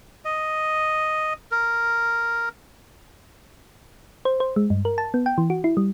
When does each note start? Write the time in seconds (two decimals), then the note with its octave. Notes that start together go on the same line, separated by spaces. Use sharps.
0.25 D#5
1.51 A#4
4.25 C5
4.40 C5
4.56 G#3
4.70 G2
4.85 A#4
4.98 A5
5.14 B3
5.26 G5
5.38 E3
5.50 F#4
5.64 E4
5.77 G3